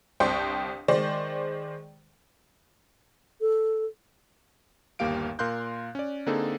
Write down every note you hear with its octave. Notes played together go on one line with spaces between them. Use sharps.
G1 C2 C5 G5 C6 C#6
D#3 G#3 C5 D5
A4
G1 D#2 A#3 G4 F5 D7
A#2 A#4 F5 C6 F#6 G6
C#4 D5
D3 A#3 C4 D#4 G#4 A4